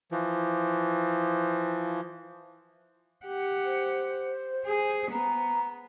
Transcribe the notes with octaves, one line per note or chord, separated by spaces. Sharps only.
E3 F3
G4 F#5
C5
G#4
B3 A#5